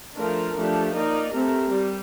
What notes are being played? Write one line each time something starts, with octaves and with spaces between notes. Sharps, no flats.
F3 A3 D4 F4 A#4
F3 A3 D4 G4
A#3 D#4 A#4 D5
A3 C4 G4 A#4
G3